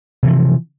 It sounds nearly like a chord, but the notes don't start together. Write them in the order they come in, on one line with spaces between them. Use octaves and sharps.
C3 E3 F3